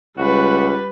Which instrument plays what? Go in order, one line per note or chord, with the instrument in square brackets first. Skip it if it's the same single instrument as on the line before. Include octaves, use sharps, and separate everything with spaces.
[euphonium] C#2 [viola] G3 B4 [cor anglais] F#4